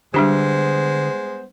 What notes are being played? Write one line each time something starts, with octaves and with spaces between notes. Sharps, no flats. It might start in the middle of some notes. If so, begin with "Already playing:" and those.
D3 G3 G#3 B3 D4 G4 C5